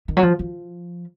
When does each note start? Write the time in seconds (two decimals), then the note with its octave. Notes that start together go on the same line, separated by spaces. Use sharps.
0.08 D#3
0.17 F#3
0.23 F3
0.39 F3